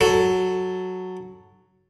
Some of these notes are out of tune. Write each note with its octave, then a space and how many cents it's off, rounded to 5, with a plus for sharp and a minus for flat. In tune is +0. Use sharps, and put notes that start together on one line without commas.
F#3 +0 A4 +0